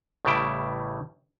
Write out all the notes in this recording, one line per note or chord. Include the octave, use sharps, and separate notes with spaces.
A1 A2 C#3 G3 E4 G5